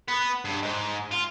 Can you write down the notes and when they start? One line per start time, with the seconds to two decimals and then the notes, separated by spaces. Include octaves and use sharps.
0.08 B3
0.45 G2
0.62 G#2
1.12 F4